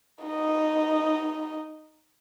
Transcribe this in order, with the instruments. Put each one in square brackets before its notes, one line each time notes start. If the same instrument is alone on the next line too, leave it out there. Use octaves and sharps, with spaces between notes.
[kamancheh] D#4 D#5